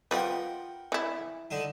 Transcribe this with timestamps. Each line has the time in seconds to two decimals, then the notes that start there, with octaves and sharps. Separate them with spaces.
0.11 F3 F4 A#4 B4 F#5 G5
0.92 E3 E4
1.51 D3 D4 D#4